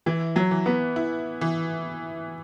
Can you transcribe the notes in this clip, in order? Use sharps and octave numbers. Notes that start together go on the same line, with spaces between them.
E3 E4
F#3
E3
B3
E4
E3